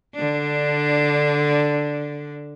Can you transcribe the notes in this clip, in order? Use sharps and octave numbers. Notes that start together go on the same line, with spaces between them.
D3 D4